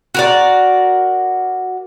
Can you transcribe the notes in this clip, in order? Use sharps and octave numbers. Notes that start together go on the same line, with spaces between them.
F#4 A#4 D5